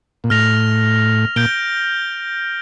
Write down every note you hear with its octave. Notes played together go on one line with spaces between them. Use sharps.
A#2
A2 F6 A#6 F7
A#2 G6 D7 G7